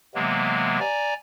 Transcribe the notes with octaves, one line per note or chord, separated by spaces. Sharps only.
C3 E3 F#3 G#3 A#3 B3
D5 G#5 A#5